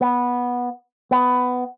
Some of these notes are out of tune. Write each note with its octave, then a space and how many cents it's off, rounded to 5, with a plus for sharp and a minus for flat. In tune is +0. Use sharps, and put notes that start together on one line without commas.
B3 -10
B3 +15